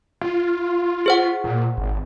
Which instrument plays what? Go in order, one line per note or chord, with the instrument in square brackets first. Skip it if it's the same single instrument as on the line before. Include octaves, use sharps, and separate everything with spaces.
[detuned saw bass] F4
[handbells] G#4 C5 F#5
[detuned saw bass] A#2
G#1